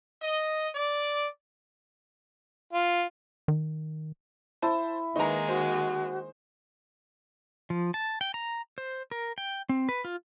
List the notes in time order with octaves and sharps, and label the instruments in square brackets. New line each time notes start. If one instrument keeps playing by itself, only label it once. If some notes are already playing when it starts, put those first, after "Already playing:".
[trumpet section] D#5
D5
[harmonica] F4
[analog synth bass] D#3
[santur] E4 [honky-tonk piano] C5 A5
[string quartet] D#3 G#3 A#3 [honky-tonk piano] D#4 A#5 [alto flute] B4 [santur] C#6 D#6
[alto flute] F#4 [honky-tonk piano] C5
[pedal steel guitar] F3
A5
G5
A#5
C5
A#4
G5
C4
B4
F4